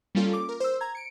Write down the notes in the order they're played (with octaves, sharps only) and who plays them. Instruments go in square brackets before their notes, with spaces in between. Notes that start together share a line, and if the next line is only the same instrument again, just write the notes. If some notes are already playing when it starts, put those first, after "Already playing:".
[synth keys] G3 A#3 C#4 F4 A4
D6
A#4
C5 E6
A#5 G#6
C#7 D7